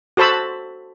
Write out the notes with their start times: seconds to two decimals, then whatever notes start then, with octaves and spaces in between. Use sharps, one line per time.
0.17 F#4 A4 C5 A5 B5 E6